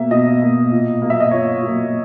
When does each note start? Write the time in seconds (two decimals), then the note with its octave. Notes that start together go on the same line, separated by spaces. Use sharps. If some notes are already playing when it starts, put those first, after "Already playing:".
Already playing: B2 A#3 E5
0.11 B2 D#5
0.42 A#3
0.71 A#2
1.02 F#3 A#3
1.10 E5
1.20 D#5
1.31 A#2 C#5
1.62 F#3 A#3